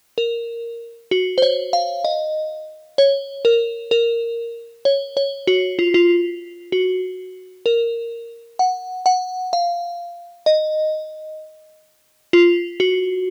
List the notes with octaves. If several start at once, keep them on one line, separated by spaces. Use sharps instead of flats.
A#4
F#4
C5
C#5
F5
D#5
C#5
A#4
A#4
C#5
C#5
F#4
F4
F4
F#4
A#4
F#5
F#5
F5
D#5
F4
F#4